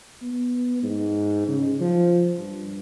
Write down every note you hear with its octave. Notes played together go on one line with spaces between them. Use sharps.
B3
G#2
C#3
F3
G2